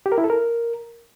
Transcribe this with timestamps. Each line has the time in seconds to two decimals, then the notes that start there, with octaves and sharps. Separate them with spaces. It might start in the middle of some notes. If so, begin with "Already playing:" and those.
0.06 G4
0.12 A#4
0.18 E4
0.24 A4
0.30 A#4